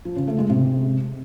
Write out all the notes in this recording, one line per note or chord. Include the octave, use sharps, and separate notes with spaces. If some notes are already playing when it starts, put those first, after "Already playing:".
F3
C#3
A3
G#3
C3